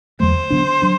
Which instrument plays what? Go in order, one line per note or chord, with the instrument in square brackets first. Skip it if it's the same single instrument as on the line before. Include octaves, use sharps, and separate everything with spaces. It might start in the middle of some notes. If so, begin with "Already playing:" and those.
[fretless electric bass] E2 D3 F#3 A3 [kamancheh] C5
[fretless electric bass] D3 F#3 B3 D4
F#3 D4